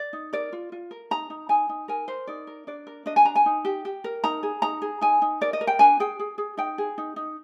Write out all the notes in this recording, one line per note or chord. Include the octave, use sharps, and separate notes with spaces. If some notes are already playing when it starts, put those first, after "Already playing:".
Already playing: D5
D#4
A#4 D5
F4
F4
A#4
D#4 A#5
D#4
D#4 G#5
D#4
A#4 G#5
A#4 C5
D#4 D5
A#4
D4 D5
A#4
D4 D#5
G#5
D4 A#5
G#5
D#4
G4
G4
A#4
D#4 A#5
G#4
D#4 A#5
G#4
D#4 G#5
D#4
A#4 D5
D#5
A#4
G5
D4 G#5
G#4 G5
G#4
G#4
D#4 G5
G#4
D#4
D#4